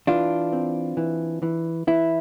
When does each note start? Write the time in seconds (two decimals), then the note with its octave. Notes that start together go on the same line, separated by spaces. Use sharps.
0.07 E3 D4 F4
0.53 C4
0.97 E3
1.43 E3
1.87 E3 E4